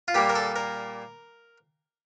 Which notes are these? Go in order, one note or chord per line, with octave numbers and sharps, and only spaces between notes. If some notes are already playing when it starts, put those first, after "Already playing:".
F4
A#2 G3 A#3 G4
A#4
A4
A#4